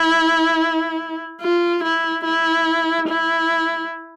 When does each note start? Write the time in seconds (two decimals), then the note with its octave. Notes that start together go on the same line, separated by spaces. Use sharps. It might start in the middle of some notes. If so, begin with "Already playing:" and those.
Already playing: E4
1.41 F4
1.84 E4
2.25 E4
3.08 E4